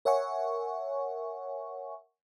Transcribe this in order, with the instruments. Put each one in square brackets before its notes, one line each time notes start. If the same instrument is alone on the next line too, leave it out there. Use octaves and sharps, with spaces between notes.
[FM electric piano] A#4 C#5 E5 F#5 G#5 C#6